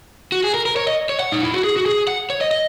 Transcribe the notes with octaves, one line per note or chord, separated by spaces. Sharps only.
F#4
G#4
A#4
A#4
C#5
D#5
C#5
F#5
D#4
E4
F#4
G#4
F#4
G#4
F#5
C#5
D#5
D#5